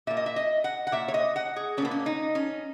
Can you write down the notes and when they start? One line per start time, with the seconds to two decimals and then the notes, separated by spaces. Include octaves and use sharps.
0.07 A#2 A#3 E5
0.17 D#5
0.26 E5
0.36 D#5
0.64 F#5
0.87 F#5
0.92 A#2 A#3 E5
1.08 C#5
1.14 D#5
1.36 F#5
1.56 G#4
1.77 A#2 C#4
1.82 A#3 B3
1.91 C#4
2.06 D#4
2.35 C#4